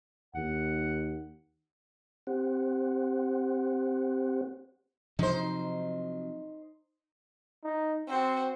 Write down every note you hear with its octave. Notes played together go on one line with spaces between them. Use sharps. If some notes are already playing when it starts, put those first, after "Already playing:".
D#2 F#5
C4 G4 C5 F#5
C3 F3 F#3 D#4 C5
D#4
C4 F#4 C5